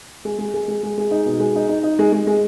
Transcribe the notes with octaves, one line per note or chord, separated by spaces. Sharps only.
G#3
G#3
G#3
G#3
G#3
G#3
D#4
B2
G#3
D#4
D#4
D#4
G#3
G#3
G#3